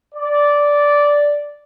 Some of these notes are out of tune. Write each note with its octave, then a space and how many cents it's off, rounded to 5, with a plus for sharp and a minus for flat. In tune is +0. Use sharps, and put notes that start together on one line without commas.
D5 -10